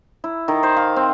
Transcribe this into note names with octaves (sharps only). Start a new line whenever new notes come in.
E4
D#3
C5
F5
C4